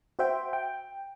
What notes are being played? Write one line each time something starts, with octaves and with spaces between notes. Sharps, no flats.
F#4 C5 E5 G5
G5